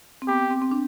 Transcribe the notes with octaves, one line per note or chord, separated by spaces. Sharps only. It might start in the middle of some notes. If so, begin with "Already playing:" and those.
C4
B3 G4
C4
C4
D4